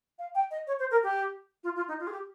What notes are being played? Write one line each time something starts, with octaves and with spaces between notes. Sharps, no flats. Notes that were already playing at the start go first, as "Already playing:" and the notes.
F5
G5
D#5
C#5
C5
A#4
G4
F4
F4
D#4
F4
G#4
G4